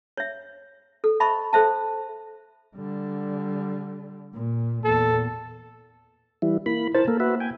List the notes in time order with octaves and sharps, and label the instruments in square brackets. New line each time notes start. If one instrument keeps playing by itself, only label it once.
[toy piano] C#5 E5
A4
C5 D#5 E5 A5 B5 C#6
A4 C5 E5 A5
[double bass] D3 G3
A#2
[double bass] E2 A#2 [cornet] A4
[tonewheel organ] E3 G3 E4
[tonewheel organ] A#3 B5 [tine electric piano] E4
[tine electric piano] E4 A#4 C5 [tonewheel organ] A5
[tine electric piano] A#3 [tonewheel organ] A4 A#4
[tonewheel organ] F#4 B4 E5
G5 G#5